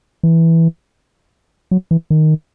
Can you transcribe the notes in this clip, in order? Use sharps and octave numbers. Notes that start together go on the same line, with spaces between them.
E3
F#3
E3
D#3